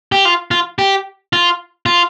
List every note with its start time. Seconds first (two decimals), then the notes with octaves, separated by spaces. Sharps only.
0.12 G4
0.25 F4
0.51 F4
0.79 G4
1.33 F4
1.86 F4